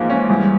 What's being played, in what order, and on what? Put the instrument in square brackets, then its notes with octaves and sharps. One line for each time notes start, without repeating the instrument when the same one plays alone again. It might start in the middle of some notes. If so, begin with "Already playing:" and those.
Already playing: [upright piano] G#2 E3 F3 A#3
C#4
[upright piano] E2 [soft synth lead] G3